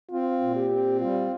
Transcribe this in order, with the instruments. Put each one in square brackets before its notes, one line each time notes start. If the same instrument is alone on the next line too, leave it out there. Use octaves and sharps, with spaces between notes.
[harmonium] C4 [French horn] F4
[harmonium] A#2
[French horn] G4
[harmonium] C4
[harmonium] G3 [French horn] F4